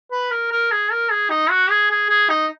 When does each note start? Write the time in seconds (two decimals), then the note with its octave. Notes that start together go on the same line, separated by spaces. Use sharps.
0.11 B4
0.31 A#4
0.51 A#4
0.72 G#4
0.92 A#4
1.10 G#4
1.30 D#4
1.50 F#4
1.70 G#4
1.91 G#4
2.09 G#4
2.29 D#4